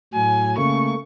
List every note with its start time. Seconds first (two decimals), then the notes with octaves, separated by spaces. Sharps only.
0.14 A2 F#3 G#5
0.57 C#3 A3 A#3 C#6